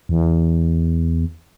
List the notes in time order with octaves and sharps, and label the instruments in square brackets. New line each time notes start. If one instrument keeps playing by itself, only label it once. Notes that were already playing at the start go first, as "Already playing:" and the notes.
[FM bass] E2